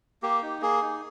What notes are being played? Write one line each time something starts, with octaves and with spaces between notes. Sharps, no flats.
A#3 G4
D#4
A#3 G#4
D#4